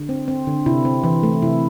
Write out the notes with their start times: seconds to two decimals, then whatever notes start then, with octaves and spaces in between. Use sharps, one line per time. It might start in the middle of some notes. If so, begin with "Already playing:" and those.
Already playing: D3
0.09 C4
0.28 C4
0.47 D3
0.66 C3 E4
0.85 C4
1.04 E3
1.23 A3
1.42 C3 E4